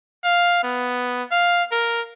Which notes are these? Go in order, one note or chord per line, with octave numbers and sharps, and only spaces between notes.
F5
B3
F5
A#4